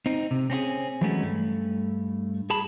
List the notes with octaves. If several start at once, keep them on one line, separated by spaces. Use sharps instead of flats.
C4 D#4
C3
C4 C#4 F4 G#4
E3 F#3 G#3 A3 B3 C#4
G2 A3
G#4 A5 B5